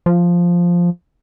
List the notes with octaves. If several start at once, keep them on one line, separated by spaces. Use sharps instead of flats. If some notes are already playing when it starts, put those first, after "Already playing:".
F3